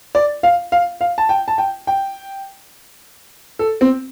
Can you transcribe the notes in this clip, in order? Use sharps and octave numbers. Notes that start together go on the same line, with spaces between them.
D5
F5
F5
F5
A5
G5
A5
G5
G5
A4
C4